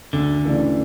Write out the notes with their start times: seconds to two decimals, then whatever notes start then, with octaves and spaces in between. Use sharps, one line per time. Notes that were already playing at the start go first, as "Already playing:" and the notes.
0.13 D2 D3
0.45 C#3 E3 A3 D4